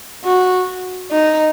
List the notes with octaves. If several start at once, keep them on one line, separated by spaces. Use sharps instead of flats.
F#4
D#4